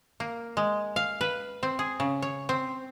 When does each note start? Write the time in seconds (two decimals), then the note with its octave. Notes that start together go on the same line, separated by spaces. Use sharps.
0.20 A#3
0.57 G#3
0.96 F5
1.21 B4
1.63 C4
1.79 G#4
2.00 C#3
2.22 C#5
2.49 C4